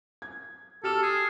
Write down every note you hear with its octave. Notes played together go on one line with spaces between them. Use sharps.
G#6
G4 A4 F6 E7
G#4